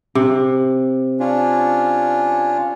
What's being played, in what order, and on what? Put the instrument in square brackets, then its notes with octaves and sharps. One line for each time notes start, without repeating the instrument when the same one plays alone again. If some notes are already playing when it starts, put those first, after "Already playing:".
[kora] C3
[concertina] C#4 D4 F4